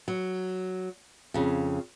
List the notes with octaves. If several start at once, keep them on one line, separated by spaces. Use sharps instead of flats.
F#3
F2 C#3